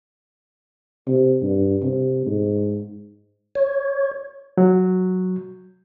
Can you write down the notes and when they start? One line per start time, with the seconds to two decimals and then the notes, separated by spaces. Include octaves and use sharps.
1.08 C3
1.43 G2
1.82 C3
2.26 G#2
3.55 C#5
4.58 F#3